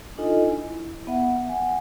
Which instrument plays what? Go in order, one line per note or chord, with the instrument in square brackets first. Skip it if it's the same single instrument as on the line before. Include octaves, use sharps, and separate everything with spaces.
[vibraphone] D4 D#4 F4 A4 D#5 G#5
E4
B3 E5 F#5
F#5 G#5